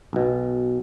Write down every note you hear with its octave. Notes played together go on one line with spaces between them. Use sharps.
B1 B2